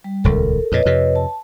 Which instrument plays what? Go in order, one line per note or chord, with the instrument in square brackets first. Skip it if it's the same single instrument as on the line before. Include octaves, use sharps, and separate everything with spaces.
[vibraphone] G3
[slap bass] D#1 C#2 [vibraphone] A4 A#4
[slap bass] F2 A#2 [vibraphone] B4 C#5 D#5
[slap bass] F2 C3
[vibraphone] A5